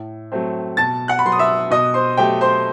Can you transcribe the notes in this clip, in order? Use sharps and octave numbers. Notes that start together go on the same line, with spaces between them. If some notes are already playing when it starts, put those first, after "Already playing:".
Already playing: A2
F#3 A3 C4
B2 A5 A6
F#5 F#6
B5
F#3 B3 C6
D#6
E5 E6
B2 D#5 D#6
C5 C6
F#3 A3 G4 G5
C5 C6